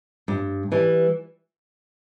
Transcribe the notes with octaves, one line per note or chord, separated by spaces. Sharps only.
G2
E3 G3